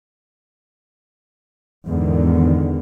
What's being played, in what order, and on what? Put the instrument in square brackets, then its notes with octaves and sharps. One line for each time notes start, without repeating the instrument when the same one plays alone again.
[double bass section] E2 G#2 D3 D#3